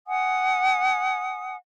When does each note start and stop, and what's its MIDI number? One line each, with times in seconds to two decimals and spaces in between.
0.07 1.56 78
0.07 1.56 80
0.07 1.56 87